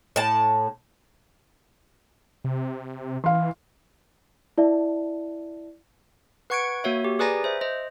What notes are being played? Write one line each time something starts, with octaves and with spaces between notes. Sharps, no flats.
A2 A5
C3
E3 F5 C6
E4 D5 E5 A5
B4 F#5 C#6 G#6 C#7 D7
A#3 F#4 C#5 E5
G4
G#4 B4 D5 G#5 A#5 A#6
C5 E5
C5 D#5